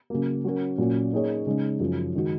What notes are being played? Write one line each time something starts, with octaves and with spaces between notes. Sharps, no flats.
C#3 F#3 A#3
F#3 C#4 F#4 A#4
A#2 F#3 C#4 F#4
A#3 D#4 G#4 C#5
C#3 G#3 D#4
F#2 C#3 F3
D#3 G#3 D#4 F#4